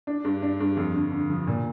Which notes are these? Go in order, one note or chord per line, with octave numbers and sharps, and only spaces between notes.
D4
G2
D4
G2
F2
D3
D3
F3
A#2